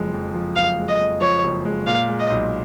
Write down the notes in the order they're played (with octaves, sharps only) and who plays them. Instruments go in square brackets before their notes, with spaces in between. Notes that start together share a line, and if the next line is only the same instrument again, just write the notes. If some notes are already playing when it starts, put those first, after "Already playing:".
Already playing: [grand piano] F#1 F2 F3 G#3
F2
F3
[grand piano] F#1 [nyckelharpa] F5
[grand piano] G#3
[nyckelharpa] D#5
[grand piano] F2
[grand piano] F3 [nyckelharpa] C#5
[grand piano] F#1
G#3
[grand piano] A#2 [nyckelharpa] F5
[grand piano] G#3
[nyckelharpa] D#5
[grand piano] B1